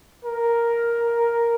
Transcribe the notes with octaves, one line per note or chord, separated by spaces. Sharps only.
A#4